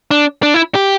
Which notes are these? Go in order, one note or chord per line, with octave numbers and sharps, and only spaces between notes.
D4
D4
E4
G4